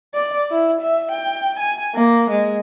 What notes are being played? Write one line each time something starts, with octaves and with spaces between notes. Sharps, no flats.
D5
E4
E5
G5
G#5
A#3
G#3